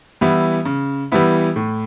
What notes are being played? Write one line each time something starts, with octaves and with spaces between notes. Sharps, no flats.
E3 G3 B3 E4
C#3
E3 G3 B3 E4
A2